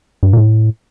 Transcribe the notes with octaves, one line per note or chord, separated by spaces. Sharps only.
G2
A#2
A2